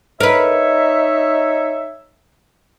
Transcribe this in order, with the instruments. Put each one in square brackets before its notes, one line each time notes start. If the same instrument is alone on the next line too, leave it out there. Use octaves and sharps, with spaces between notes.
[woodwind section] D#4 C#5 E5 [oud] A#4 B4